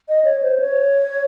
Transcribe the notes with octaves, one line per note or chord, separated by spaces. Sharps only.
D#5
C#5
C5
C#5